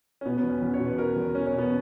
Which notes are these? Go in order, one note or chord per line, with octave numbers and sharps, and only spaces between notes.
C#4
B2 B3
B3
E2
C#4
E2
C#5
B2
B4
B2 A#4
E2
E2 C#4
C#4
B2
B3